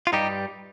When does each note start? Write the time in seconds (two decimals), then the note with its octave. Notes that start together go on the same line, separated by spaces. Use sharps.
0.07 F4
0.12 G2 G3 D#4 G4